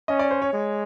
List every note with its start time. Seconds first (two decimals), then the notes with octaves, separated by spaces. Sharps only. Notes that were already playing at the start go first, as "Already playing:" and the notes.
0.08 C#4 D#5
0.19 D5
0.31 C5
0.42 C#5
0.53 G#3